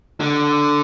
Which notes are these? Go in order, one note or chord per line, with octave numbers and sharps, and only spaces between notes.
D3